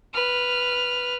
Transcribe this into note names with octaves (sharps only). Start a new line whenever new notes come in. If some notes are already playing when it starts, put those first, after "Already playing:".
B4 F6